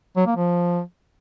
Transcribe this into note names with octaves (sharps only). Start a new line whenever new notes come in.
F#3
A#3
F3